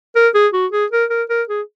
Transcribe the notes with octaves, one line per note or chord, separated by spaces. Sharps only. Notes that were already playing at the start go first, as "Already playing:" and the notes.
A#4
G#4
F#4
G#4
A#4
A#4
A#4
G#4